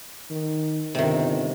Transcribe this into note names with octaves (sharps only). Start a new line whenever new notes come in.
D#3
G1 C3 D#3